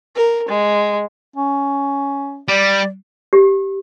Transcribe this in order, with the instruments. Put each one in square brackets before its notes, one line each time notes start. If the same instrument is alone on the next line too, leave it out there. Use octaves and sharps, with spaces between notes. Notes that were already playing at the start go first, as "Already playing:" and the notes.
[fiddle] A#4
G#3
[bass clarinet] C#4
[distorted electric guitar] G3 [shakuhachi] D5
[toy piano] G4